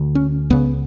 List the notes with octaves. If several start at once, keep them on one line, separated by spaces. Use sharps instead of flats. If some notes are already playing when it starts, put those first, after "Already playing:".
Already playing: D2 D3
C#4
C#2 C#3 B3